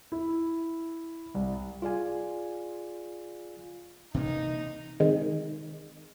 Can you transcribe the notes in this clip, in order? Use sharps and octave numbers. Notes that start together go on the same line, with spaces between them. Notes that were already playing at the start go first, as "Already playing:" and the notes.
E4
C2
F4 G#4 D5 F5 G#5
C3 E3 A#3 D#4
C3 D#3 G#3